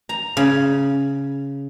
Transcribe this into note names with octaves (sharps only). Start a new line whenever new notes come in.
A#5
C#3